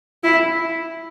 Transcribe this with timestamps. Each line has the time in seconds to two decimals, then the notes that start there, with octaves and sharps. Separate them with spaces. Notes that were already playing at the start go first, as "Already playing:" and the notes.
0.24 E4